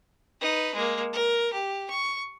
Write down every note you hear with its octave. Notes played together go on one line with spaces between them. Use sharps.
D#4 B4
G#3 A#3
A#4
G4
C#6